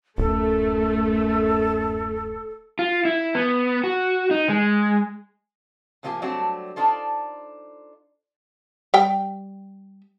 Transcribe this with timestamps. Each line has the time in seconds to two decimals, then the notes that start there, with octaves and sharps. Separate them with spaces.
0.18 D1 F#2 A3 A4
2.79 F4
3.05 E4
3.35 B3
3.84 F#4
4.31 D#4
4.49 G#3
6.03 A2 E3 F3 A#3 G4 G#5
6.22 F#3 G3 A3 C4 D4 F#4
6.76 D4 D#4 F4 A4 C5
8.94 G3 G5